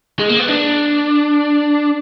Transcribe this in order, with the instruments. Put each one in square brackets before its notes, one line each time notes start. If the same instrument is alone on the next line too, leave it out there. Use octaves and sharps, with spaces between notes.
[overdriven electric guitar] G#3
A#3
B3
D4